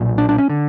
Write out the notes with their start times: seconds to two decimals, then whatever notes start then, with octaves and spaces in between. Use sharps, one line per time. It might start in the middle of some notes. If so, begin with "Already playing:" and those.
Already playing: B1 A#2
0.18 D4
0.29 D4
0.38 C#4
0.50 D3